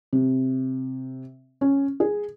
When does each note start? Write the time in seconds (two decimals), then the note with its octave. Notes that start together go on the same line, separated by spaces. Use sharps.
0.13 C3
1.61 C#4
2.00 G#4